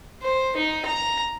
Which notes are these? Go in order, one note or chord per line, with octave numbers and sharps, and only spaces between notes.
C5
D#4
A#5